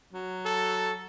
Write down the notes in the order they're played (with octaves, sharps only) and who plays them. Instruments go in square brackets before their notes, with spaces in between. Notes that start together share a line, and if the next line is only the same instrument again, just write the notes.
[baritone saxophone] F#3
[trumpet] A4